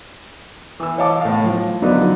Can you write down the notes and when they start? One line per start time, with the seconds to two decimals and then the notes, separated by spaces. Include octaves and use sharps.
0.80 E3 E6
0.98 C#5 D#5 F5 A5 D6
1.21 A2 F5
1.44 F3
1.82 D3 F3 F#3 B3 D4 D#4